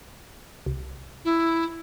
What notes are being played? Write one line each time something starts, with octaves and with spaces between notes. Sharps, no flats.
C2
E4